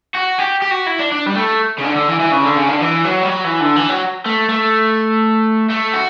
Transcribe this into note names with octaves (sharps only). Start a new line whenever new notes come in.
F#4
G4
G4
F#4
E4
D4
D4
G3
A3
C#3
D3
D3
E3
E3
C#3
D3
C#3
D3
E3
F#3
G3
F#3
E3
D3
E3
F#3
A3
A3
A3
F#4